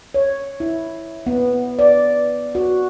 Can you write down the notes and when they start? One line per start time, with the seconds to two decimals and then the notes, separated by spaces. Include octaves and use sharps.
0.14 C#5
0.60 E4
1.26 B3
1.79 D5
2.55 F#4